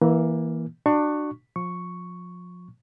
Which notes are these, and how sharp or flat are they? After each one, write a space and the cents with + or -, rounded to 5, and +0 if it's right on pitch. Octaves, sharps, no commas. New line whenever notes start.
E3 -5 A#3 +15
D4 +25 F#4 +5 C#6 +0
F3 +30 C#6 +0